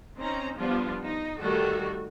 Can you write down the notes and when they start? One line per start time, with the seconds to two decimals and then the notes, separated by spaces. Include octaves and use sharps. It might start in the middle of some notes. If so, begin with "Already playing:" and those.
0.19 C4 C#4 D#4 A#5
0.58 F3 G3 B3 D4 F4
1.05 D#4
1.41 D#3 G3 A3 F#4 A4